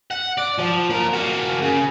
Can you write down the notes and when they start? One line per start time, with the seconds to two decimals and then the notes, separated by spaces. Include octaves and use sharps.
0.11 F#5
0.38 D5
0.58 F3
0.90 A#2 A#4
1.14 A#3 F#4
1.62 C#3